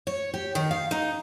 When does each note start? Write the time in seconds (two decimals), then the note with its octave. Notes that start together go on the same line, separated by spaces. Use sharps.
0.07 C#5
0.34 G4
0.55 D#3
0.71 F5
0.91 D#4